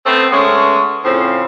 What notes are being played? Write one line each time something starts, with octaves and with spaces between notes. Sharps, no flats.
A3 B3 C4
G#3 A3 B3 C#4
A2 C#3 F3 C4